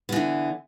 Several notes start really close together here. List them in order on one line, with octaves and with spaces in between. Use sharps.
B3 E3 D3